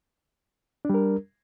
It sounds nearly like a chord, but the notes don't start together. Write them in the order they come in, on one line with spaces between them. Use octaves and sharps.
D4 G3 A#4